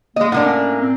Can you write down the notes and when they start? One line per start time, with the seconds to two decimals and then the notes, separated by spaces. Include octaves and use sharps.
0.16 G#3 A#3 D#5
0.32 A2 A#3 D4 F#5
0.45 C#4
0.81 C4